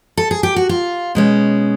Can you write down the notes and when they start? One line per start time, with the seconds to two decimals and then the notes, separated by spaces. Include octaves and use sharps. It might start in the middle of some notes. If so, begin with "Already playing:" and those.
0.17 A4
0.31 G#4
0.43 G4
0.56 F#4
0.69 F4
1.15 B2 G#3 C#4